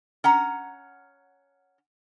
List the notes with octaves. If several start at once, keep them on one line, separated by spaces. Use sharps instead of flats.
C#4 F#5 A#5